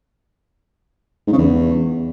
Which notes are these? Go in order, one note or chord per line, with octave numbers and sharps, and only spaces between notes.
G#2
C#3
E2